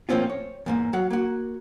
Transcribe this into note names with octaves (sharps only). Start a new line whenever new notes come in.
A2 F3 A#3 C4 C#4 F4
C#5
E2 G#2 A#3
F#3 F5 F#5
A#3 F#4